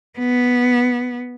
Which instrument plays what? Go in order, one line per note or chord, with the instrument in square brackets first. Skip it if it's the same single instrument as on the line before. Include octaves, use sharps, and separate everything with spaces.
[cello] B3